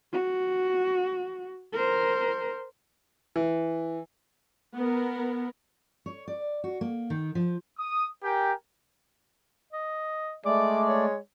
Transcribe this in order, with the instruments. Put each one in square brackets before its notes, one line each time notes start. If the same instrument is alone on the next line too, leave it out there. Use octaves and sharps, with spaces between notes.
[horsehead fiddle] F#4
A#4 C5
[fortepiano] E3
[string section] B3 A#4
[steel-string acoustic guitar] C#5
D5
F#4
A#3
D#3
F3
[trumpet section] D#6
G4 A#4 G5 G#5
[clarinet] D#5
[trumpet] G#3 [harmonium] A3 D5 [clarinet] D6
[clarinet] C#5